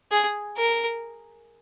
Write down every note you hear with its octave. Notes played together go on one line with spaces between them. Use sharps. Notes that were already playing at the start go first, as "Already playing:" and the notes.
G#4
A#4